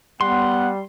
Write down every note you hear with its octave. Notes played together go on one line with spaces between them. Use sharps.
G3 B3 F#5 C6